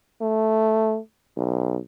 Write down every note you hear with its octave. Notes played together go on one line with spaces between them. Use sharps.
A3
B1